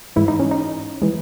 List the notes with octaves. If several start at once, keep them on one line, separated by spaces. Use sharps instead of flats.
G#2 E3 G#3 E4
D#4
C#4
D#4
E3 G#3